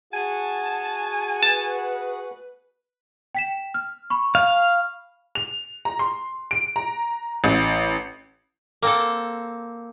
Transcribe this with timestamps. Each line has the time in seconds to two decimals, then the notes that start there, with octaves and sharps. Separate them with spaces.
0.13 F#4 G#4 F#5 G#5 A5
1.43 B4 A5
3.35 G5 B6 E7
3.74 F6
4.10 B5 C#6
4.35 F5
5.35 F7
5.85 A#5
5.99 C6
6.51 D7
6.76 A#5
7.44 A1
8.82 A#3 C4 A4